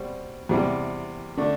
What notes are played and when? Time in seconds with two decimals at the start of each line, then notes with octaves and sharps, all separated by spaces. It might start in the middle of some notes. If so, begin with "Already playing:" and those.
Already playing: B2 G3 C4
0.49 E2 C3 G3
1.37 D3 A3 D4